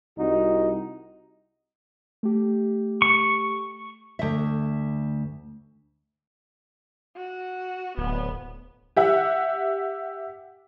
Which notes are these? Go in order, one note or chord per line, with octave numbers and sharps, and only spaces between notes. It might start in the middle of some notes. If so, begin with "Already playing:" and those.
C2 D#4 F#4
A3 G4
C#6
D2 E5
F#4
D1 B3
G4 E5 F#5